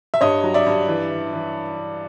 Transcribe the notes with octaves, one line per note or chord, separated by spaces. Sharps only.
E5
G2 C#5 D#5
F#3
D5 E5
G2
E3
E3
E3